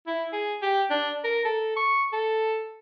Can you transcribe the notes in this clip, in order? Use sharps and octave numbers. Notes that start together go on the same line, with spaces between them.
E4
G#4
G4
D4
A#4
A4
C#6
A4